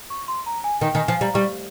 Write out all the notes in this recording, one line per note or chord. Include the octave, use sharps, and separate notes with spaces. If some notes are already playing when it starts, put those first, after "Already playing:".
C#6
C6
A#5
G#5
D#3 G5
D#3 G#5
F3 G#5
G3 A#5
G3 C#6